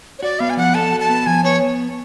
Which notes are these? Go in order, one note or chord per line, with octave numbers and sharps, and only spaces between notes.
C#5
F#4 D5
B3 F5
G#5
F3 F#5
A4 A5
F#4
A5
B3
F3 G#5
B3 C#5